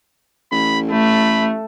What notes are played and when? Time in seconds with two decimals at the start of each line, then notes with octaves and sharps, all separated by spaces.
0.52 A1 B5
0.91 A3 B5